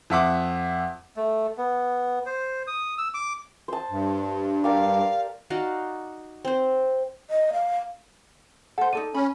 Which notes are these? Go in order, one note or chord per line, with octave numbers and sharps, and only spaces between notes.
F2 E5 F#5 D6
A3
B3
C5
D#6
E6
D6
C5 A5
G2
G4 A#4 D5 F5
D#4 F#4 D5 F5
C4 C5
D#5
F5
A4 C5 F#5
D#4 A4 D5 D#7
C#4 B5